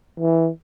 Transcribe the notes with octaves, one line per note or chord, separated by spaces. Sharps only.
E3